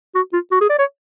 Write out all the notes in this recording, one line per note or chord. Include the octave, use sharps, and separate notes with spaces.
F#4
F4
F#4
G#4
D5
C#5